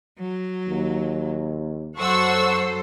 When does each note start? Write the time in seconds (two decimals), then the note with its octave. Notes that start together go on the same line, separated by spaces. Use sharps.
0.18 F#3
0.68 D#2
1.99 F#2 F#3 A4 C5 F#5 C#6 E6